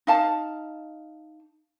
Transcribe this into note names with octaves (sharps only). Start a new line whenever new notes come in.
D#4 F5 A5